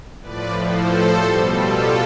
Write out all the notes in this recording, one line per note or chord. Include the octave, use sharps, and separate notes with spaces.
A2 F3 B4 D5
A4 C5
B2 G3
F4 A4